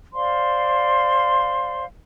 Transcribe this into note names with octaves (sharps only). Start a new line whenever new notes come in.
C5 D5 F5 C6